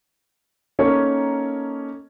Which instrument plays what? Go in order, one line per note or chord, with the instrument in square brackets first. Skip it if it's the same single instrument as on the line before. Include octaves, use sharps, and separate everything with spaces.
[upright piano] A#3 C#4 D#4 A4 A#4 C#5